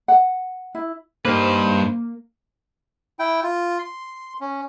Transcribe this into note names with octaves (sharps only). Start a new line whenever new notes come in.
F#5
E4
G2 A#3 D#4 G4 B4 C5
E4 G5
F4
C6
C#4